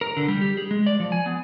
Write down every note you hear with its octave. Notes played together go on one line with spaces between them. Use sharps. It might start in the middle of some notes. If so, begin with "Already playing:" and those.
A#4
D3
G3
G4
G#4
G#3
D5
F3
G#5
B3